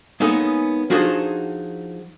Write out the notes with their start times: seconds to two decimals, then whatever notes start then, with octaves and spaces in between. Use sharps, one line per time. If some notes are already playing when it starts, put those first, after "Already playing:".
0.20 G#3 A#3 B3 C#4 D#4 A4
0.90 F3 D4 D#4 F#4 G#4 A4